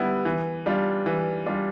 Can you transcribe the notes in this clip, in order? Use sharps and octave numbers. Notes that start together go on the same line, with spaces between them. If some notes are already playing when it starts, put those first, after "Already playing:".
Already playing: D3 G3 B3 E4
E3
G3 D4 F4
E3
G3 D4 F4